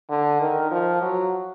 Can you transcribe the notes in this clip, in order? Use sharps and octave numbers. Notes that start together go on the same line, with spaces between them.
D3
D#3
F3
F#3